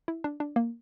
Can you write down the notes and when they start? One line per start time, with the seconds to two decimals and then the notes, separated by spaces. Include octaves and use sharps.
0.08 E4
0.24 D4
0.40 D4
0.56 A#3